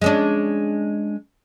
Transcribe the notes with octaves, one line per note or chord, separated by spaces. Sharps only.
G#3 C#4 D4